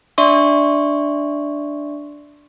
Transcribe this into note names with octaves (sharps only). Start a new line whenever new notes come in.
D4 D5 E5 C6 C#6